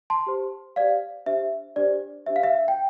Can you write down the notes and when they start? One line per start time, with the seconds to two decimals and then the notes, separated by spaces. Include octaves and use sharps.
0.10 A5 C6
0.27 G4 C5
0.76 G4 C5 D5 F5
1.26 D4 G4 C5 E5
1.76 D4 G4 C5 D5
2.26 D4 G4 C5 E5
2.36 F5
2.43 E5
2.68 G5